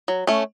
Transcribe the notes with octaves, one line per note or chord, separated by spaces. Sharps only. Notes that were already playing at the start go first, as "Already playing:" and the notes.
F#3
A3 C#4